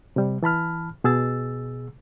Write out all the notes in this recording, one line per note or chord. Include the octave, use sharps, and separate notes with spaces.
C3 G3
E3 A5 B5 F6
B2 G#4 E6 A6